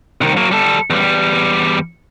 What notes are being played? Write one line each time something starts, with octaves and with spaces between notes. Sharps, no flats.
C2 D#3
F#3 A#3
G3 A4
E2 G3